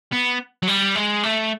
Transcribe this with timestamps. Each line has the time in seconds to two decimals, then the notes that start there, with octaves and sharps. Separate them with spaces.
0.12 B3
0.63 F#3
0.68 G3
0.96 G#3
1.23 A3